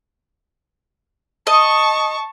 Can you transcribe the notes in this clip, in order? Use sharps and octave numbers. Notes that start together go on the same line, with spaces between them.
D#5 A5 C#6